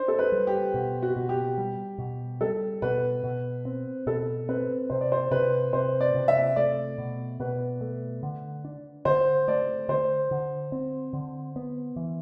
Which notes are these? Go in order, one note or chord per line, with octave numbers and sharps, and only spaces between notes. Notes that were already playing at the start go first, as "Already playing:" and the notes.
Already playing: D4 C5
A4
B4
G3
G4
B2
F#4
B2
G4
G3
B2
G3 A4
B2 B4
B2
C4
B2 A4
C4 B4
C3 C5
D5
C5
C3 B4
C3 C5
D5
C3
E5
A3 D5
B2
B2 B4
A3
D3
D4
D3 C5
A3 D5
D3 C5
D3
C4
D3
B3
E3